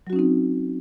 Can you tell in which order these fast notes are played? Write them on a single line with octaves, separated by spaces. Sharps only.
F#3 F#4 C#4 D#4 C4